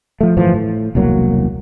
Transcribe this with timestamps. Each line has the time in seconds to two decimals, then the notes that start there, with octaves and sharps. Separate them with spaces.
0.21 F3 A3
0.36 G1 A2 E3 F3
0.54 A2
0.95 E1 C2 F#3 A#3